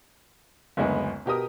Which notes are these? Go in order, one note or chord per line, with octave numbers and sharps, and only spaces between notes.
F#1 D2 G#3 B3
B2 G4 A#4 D#6